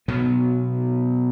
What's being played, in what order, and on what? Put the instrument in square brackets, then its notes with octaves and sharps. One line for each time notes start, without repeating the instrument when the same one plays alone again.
[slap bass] B2 F#3 B3